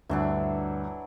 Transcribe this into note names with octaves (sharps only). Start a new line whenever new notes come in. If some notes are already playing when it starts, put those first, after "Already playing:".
D2 G2 E3 F#3 D4